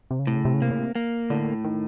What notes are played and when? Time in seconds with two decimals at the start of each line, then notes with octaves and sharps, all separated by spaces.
0.11 C3
0.19 C#3
0.27 A2 C3
0.36 C#3
0.45 C3
0.54 C#3
0.62 C3 A#3
0.70 C#3
0.79 C3
0.95 A#3
1.30 A2 D3
1.64 D#3